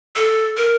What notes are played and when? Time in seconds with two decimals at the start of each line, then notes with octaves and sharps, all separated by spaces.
0.16 A4
0.57 A#4